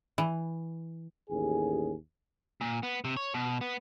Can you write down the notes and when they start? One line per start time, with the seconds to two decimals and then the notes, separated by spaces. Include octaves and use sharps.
0.18 E3
1.30 A1 D#2 G#4
2.61 A#2
2.83 B3
3.04 C3
3.17 C#5
3.34 B2
3.61 B3